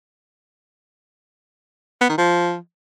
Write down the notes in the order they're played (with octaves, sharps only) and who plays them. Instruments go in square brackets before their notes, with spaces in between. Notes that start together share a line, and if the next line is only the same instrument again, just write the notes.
[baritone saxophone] B3
D#3
F3